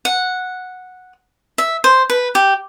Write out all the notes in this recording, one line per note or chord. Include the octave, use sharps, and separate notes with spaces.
F#5
E5
C5
B4
G4